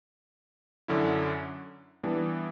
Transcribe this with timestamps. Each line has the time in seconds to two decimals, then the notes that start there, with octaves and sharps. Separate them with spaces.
0.88 F#2 D3 F#3 C#4 E4
2.03 E3 G3 B3 D4